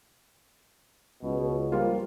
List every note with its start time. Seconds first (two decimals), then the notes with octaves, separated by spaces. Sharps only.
1.23 C#2 B2
1.72 F3 G3 A#3 F4